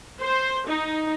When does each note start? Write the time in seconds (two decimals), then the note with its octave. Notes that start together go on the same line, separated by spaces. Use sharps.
0.21 C5
0.67 D#4